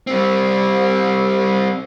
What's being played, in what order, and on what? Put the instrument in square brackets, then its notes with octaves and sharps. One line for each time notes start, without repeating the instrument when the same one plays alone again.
[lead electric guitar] G3 C4